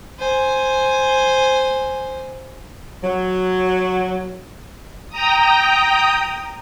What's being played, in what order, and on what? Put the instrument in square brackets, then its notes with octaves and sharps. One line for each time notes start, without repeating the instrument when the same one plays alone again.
[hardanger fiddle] C5 G#5
[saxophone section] F#3
[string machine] G5 A#5 D#6